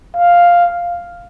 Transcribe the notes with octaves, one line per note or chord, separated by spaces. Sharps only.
F5